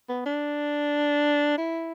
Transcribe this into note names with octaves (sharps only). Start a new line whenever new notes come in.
B3
D4
E4